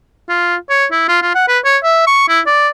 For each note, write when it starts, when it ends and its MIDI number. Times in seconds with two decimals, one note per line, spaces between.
0.29 0.56 65
0.70 0.86 73
0.91 1.05 64
1.08 1.21 65
1.22 1.34 65
1.35 1.46 78
1.48 1.59 71
1.65 1.78 73
1.83 2.04 76
2.07 2.27 85
2.29 2.41 64
2.47 2.68 74